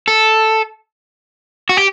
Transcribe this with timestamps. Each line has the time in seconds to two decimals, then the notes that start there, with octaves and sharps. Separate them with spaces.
0.08 A4
1.69 F#4
1.77 G4